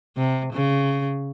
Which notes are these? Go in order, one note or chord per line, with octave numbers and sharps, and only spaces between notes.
C3
C#3